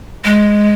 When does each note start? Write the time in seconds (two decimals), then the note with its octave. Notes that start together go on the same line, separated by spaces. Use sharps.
0.25 G#3